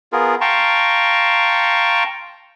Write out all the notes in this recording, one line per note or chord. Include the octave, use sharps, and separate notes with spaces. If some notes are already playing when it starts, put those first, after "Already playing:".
B3 F4 G#4 A#4
F5 G5 A5 A#5 C6 C#6